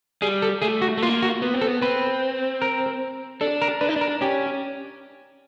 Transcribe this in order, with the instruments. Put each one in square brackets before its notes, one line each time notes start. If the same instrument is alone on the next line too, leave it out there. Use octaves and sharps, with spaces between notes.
[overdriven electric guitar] G3 [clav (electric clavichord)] G#4
[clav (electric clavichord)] A4
[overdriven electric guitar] A3 [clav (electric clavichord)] G#4
[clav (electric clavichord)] F#4
[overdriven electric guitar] A3
[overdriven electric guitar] A#3 [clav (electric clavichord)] F4
[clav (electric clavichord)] F#4
[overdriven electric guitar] B3
C4
[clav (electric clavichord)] A4
[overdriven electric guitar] B3
[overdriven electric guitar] C4 [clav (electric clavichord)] B4
[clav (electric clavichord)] A#4
[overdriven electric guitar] D4 [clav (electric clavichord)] A4
[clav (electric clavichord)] A#4
[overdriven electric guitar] D4 [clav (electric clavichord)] B4
[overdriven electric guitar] D#4
[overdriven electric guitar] D4 [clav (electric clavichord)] A#4
[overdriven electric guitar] C#4 [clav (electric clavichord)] G4